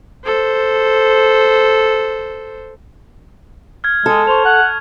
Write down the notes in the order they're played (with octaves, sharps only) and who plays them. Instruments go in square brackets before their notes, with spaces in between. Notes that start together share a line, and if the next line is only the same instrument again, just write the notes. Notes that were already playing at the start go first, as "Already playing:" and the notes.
[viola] A4 C5
[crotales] F6 G#6
[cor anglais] G#3 [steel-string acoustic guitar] A4
[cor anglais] C5 [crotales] C#6 F7
[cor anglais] F#5